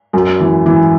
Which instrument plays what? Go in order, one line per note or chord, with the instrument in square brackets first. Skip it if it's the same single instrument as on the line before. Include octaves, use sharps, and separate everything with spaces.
[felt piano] F#2
E3
E3